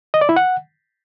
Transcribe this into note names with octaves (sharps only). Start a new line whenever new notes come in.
D#5
D5
E4
F#5